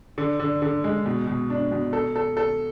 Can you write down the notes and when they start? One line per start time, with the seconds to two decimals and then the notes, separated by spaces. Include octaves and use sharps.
0.18 D3
0.40 D3
0.62 D3
0.84 G#3
1.06 B2
1.27 B2
1.50 D4
1.72 B2
1.93 A4
2.16 A4
2.37 A4